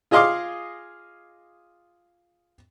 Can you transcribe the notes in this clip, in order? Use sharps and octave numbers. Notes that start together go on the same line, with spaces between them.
F4 G#4 D#5 F5 C6 D6